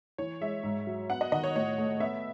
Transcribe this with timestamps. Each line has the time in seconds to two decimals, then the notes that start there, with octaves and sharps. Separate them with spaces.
0.18 E3 C#5
0.41 G#3 E5
0.63 G#2
0.87 F#3
1.10 B3 F#5
1.21 D#5
1.32 D#3 D#5
1.43 C#5
1.55 A2 C#5
1.78 A3
2.00 B3 E5